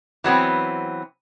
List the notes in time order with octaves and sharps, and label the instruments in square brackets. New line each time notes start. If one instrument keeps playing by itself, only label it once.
[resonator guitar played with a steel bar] E3 F#3 B3 C4